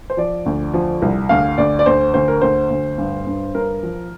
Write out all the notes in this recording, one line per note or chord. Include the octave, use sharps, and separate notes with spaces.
C5
F3 D5
D2
F3
C2
D2 F5
D2 D5
D5
D2 C5
D2 C5
A#4
D2 C5
D2
G2
G2
G2 A#4
F3